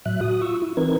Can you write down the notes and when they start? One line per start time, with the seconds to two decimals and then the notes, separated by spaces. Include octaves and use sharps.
0.06 A2 F#3 E5 F#6
0.21 F#4 D#6
0.42 F4 C#6 E6
0.62 E4
0.77 E3 C4 D#4 A#4 B4 G#6